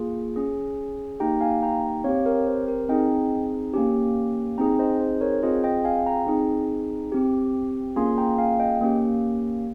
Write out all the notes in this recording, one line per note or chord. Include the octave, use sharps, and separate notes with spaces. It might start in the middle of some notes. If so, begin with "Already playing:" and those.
Already playing: A#3 F4 G#4
C#4 G#4
A#3 D#4 G4 G5 A#5
F5 G#5
G5 A#5
C4 G4 C#5 F5
A#4 C#5
C5
A#4
C4 D#4 G#4 D#5 G5
A#3 C#4 G4
C4 D#4 G#4 G5 A#5
C5 D#5
C5
A#4 C#5
C4 F4 G#4 C5 D#5
D#5 G5
F5 G#5
G5 A#5
C4 D#4 G#4
C4 G4
A#3 C#4 F4 G#4 G#5 C6
G5 A#5
F5 G#5
D#5 G5
A#3 C#4 G4